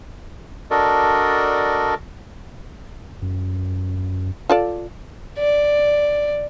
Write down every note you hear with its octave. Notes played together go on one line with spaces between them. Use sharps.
D4 F#4 A4 A#4 D5 D#5
F#2
F4 A4 D5
D5